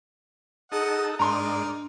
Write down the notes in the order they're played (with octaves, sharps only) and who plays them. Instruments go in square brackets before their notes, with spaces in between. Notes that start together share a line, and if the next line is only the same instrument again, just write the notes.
[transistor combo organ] D#4 A4 [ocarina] G#4 [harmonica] D#5 F#5
[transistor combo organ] G#2 D5 [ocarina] D4 [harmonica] D#4 A#4 [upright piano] A#5 C6